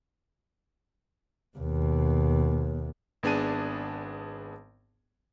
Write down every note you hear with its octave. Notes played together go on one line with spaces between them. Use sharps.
D#2 B2
G#1 B3 D4 G#4 A5 D#7